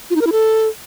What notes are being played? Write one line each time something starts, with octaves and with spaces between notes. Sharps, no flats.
F4
D#4
A#4
E4
A4